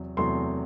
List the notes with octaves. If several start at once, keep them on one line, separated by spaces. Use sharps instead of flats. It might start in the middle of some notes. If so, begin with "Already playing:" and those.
Already playing: E2 C3 F#3
E2 C3 F#3 A3 C4 C6